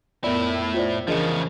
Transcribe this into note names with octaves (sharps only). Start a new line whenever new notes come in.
F2 A2 B3 E4 A#4 D5
F4 C5 D5
C#3 E3 F3 D4 G#4 A#4 D#5 C#7